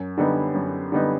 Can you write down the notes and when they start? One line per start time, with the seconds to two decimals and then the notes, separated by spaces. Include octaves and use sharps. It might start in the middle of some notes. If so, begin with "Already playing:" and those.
Already playing: F#2
0.18 D3 G3 B3 D#4
0.54 F#2
0.92 D3 G3 B3 D#4